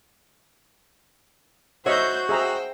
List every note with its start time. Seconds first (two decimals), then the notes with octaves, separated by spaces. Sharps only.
1.86 F#4 C5 C#5 D#5 E5 G6
2.29 G#4 C5 E5 G5 A#5